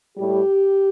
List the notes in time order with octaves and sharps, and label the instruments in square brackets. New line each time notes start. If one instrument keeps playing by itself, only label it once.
[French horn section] A2 G3 G4